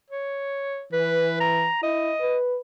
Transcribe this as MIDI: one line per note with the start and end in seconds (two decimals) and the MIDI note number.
0.10 0.84 73
0.92 1.68 52
0.92 1.37 71
1.40 1.79 82
1.83 2.13 64
1.83 2.37 75
2.20 2.57 71